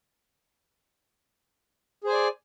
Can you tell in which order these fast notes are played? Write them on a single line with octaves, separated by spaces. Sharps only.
G#4 C5 G#5 D5